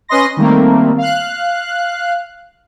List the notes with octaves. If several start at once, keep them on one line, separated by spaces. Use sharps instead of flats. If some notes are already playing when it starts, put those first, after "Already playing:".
C#4 B4 D#5 C6 A#6
D#3 G3 A3 A#3 C4
F5 F#6